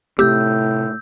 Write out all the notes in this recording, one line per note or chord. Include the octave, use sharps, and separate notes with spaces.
A2 C3 A3 C4 G4 E6 G6